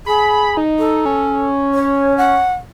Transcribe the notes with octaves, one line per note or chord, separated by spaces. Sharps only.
G#4 B5
D#4
A4
C#4
C#5
F#5